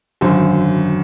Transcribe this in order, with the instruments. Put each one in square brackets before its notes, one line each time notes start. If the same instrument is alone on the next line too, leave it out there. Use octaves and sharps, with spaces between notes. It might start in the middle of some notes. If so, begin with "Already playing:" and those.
[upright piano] G#1 F#2 D3 C5